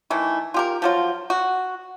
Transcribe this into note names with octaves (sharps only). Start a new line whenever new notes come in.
D#3 E3 A3
F4 G4 A#4
F3 F#3 F4
F#4